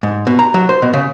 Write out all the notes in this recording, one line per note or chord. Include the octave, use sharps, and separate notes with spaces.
G#2
B2
A#5
F#3
C5
B2
C#3